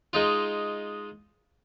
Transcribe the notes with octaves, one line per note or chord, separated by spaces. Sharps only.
G#3 D#4 F4